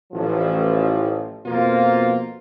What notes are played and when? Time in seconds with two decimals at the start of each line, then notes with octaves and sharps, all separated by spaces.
0.13 A1 F3
1.45 F2 B2 A#3 F4 C5